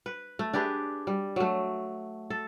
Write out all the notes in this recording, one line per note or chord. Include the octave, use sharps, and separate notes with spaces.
B4
A3
D4 G4 G#4 B4
G3
F#3 A3
A4